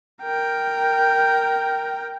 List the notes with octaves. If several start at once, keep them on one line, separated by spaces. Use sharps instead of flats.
A#4 G5